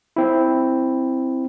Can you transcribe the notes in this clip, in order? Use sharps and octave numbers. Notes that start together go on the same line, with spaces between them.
C4 E4